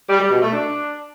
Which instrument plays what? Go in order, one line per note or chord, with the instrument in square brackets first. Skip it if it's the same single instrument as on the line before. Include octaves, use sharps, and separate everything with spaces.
[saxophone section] G3
G3
B2
A3
D4